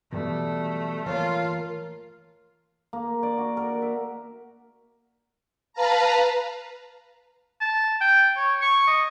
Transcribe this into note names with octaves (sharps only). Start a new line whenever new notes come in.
B2 E3 F#3 G3 A3
E3 A3 A#3 F4 A#4 C#5 A5
A#3
D5
F#4
A#4
E5
B4 F5 A5 A#5
A5
G5
C#5
C#6
D#5